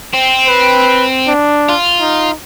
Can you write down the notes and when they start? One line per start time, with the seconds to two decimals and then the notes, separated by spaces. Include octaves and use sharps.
0.13 C4
0.47 B4
1.28 D4
1.69 F4
2.00 D#4